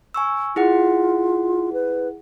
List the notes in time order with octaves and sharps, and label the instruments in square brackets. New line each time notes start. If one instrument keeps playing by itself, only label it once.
[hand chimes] G#5 C#6 E6
[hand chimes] E4 G#4 F#5 [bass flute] F4
[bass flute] B4